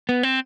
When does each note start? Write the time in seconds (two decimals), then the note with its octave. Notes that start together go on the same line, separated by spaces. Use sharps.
0.09 B3
0.23 C4